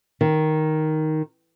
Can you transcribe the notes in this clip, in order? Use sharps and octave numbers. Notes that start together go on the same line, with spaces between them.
D#3